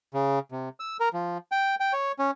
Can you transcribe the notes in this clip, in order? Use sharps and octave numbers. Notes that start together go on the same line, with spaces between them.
C#3
C3
E6
A#4
F3
G5
G5
C#5
C#4